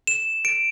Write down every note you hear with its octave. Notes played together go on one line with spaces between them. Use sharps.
E7
D7